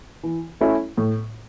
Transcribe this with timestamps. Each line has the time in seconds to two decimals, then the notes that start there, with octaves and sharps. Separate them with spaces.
0.24 E3
0.61 A3 C#4 E4
0.97 A2